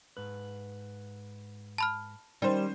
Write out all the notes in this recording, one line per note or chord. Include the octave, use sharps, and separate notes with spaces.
G#2 B4
A5 B5 F6
D#3 G3 C#4 C5